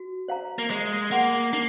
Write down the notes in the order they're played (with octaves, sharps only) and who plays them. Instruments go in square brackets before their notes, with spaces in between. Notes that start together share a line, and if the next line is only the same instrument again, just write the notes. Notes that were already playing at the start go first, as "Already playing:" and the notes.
Already playing: [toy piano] F#4
C5 F5 A#5
[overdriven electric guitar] A#3
[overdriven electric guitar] G#3 [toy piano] C5
[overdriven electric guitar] A#3 [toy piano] F#5 C6
[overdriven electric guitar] A#3 [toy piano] D#4